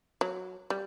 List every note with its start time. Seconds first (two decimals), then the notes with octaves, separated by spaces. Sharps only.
0.21 F#3
0.70 G3